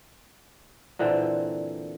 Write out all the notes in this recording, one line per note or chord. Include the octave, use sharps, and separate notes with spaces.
A#2 D3 E3 C4